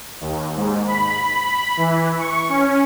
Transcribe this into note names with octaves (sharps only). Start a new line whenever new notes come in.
D#2
G#2
B5
B5
E3
C#6
C#4